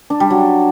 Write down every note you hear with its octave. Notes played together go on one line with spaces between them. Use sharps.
D4
G3
F#3